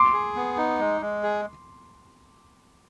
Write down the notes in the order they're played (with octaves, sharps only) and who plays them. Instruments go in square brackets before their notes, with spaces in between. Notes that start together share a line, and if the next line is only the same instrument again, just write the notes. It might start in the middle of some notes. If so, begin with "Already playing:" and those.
Already playing: [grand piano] C6 D6
[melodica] G#4
B3
D#4
G#3
G#3
G#4